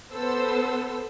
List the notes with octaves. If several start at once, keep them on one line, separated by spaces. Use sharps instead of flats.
B3 A4 C5 E6